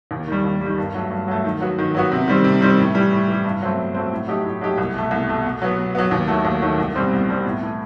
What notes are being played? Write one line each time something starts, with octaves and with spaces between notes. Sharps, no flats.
D#2
D#3 G3
D#2
D#3 G3
G2
F#3 A3
G2
F#3 A3
D#3
F#3 B3 F#4
D#3
F#3 B3 F#4
C3
D#3 G3 C4
C3
D#3 G3 C4
A2
E3 G3
A2
E3 G3
G2
F#3 A3 C4
G2
F#3 A3 C4
A2
F#3 A3 D#4 G4
A2
F#3 A3 D#4 G4
C2
B2 A3
C2
B2 A3
B2
F#3 B3
B2
F#3 B3
D#2
D#3 F#3 A3
D#2
D#3 F#3 A3
C2
B2 G3 C4
C2
B2 G3 C4
A2
E3 A3